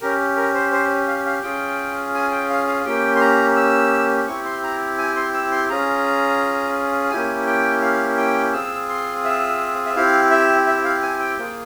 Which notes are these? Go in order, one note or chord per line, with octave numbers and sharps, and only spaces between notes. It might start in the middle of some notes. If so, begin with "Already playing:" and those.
C#4 G4 A#4
A#4
C5
C5
F5
F5
C#4 F4 G#4 G5
G#5
G5
F5
F5
A#3 C#4 G4 G5
C6
A#5
E6
C4 E4 G4 C#6
C6
A#5
G#5
C6
E6
C6
C#4 F4 G#4 A#5
A#3 C#4 E4 G4 G#5
G5
F5
G5
C4 F4 G#4 E6
C6
E5
E5
C4 E4 G4 F5
E5
E5
F5
G#5
G5
A#3 F4 G#4 G5